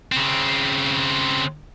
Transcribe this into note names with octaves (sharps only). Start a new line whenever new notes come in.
C#3 C4